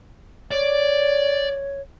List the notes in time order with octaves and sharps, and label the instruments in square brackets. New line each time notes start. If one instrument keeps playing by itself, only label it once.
[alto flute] C#5 [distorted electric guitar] D5